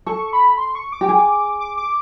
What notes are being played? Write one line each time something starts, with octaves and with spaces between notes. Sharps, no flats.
A4 C#6
B5
C6
C#6
D6
G4
G#4
D6
D6